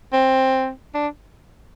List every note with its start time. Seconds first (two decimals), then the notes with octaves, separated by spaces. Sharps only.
0.13 C4
0.94 D4